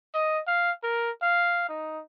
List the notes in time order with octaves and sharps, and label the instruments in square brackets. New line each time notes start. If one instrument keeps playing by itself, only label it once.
[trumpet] D#5
F5
A#4
F5
D#4